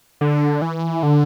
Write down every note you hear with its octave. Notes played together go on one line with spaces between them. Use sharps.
D3
E3
D3